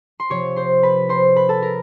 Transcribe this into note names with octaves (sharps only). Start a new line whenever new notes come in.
C6
C3 F3 C#5 C#6
C5 C6
B4 B5
C5 C6
B4 B5
A4 A5
A#4 A#5